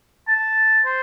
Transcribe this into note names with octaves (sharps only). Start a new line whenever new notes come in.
A5
C5